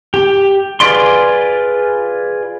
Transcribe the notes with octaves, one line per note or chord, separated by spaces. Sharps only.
G4
F4 G#4 B4 D5 C6